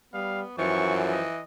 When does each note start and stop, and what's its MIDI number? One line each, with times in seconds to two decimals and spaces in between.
0.14 0.43 55
0.14 0.57 59
0.14 0.41 77
0.58 1.25 42
0.58 1.39 52
0.58 1.24 53
0.58 0.97 85
1.12 1.43 75